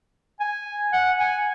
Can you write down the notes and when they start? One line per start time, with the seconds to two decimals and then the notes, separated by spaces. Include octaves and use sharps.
0.40 G#5
0.93 F#5
1.20 G#5